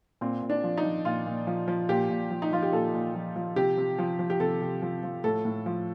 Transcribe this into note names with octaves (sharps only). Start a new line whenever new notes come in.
A#2 C4
A#2
D4
F3
D#4
F3
A#2 F4
A#2
F3
F3
A#2 G4
A#2
F3
D#4
F3 F4
G4
A#2 A4
A#2
F3
F3
C3 G4
C3
F3
F3
G4
C3 A4
C3
F3
F3
A2 A4
A2
F3